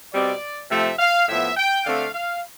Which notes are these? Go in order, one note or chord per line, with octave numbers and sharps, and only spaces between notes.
B2 G3 C4 D5
C3 F3 A3 C4 E5
F5
A2 F3 B3 E5
G5
D3 A3 C4 F5
F5